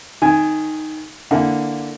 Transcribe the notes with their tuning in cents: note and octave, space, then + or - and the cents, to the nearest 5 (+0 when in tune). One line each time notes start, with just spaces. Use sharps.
D#3 +0 G#5 +0
D3 +0 A#3 +0 E4 -15